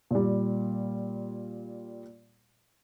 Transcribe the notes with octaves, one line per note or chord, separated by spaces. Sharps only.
A#2 G3